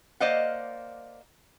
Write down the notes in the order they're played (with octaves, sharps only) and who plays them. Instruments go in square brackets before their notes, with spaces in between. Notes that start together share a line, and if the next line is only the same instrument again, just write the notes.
[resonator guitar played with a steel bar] A#3 C5 D5 D#5 F5 F#5